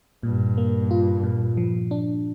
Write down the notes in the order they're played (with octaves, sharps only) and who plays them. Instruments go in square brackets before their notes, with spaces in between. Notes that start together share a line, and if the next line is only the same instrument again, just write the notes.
[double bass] G2 [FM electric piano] A#2
[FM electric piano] A#3
F4
A#2
F3
D4